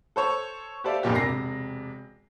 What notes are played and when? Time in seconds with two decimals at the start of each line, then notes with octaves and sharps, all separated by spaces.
0.16 A4 C5 C#5
0.84 G4 A4 C5 D5 E5 F5
1.03 A#1 F2 A#2 G4
1.15 E1 C3 A#6 C7